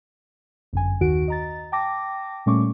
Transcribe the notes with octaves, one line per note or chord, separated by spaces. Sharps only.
G1 F#2 G#5
D#2 D#3 F#4 D7
D#5 A#5 A6
G5 A5 D6 A#6
A#2 G3 A3 C#4 C#6 D6